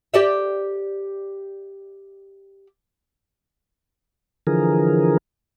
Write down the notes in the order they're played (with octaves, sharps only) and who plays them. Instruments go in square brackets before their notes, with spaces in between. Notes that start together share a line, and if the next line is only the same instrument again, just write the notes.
[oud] G4 D5 E5
[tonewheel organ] D3 E3 F3 G#4 A#4